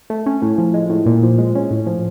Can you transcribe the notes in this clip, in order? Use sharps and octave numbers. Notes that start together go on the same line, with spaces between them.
A3
C#4
A2
F3
G#3
A2
A#2
F3
G#3
C#4
A2
F3